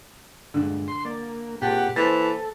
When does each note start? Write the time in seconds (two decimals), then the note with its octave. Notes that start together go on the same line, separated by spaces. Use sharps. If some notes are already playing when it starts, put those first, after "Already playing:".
0.54 G2 A#2 D3 G#3
0.88 C6
1.05 A#3 D5
1.62 A#2 C4 G4 G#4 F#5 A5
1.96 E3 A#3 A4 C5 A6